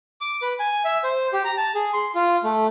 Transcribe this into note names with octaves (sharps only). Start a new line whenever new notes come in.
D6
B4
G#5
E5
C5
G4
A#5
A5
G#4
C6
F4
A3